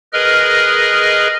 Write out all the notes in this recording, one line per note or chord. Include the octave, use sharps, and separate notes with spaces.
G#4 A#4 B4 D#5 F6